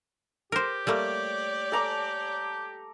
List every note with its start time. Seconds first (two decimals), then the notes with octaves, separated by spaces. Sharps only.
0.52 G4 A#4 C5
0.87 G3 A3 A#3 C#5 D5
1.72 A4 A#5 D6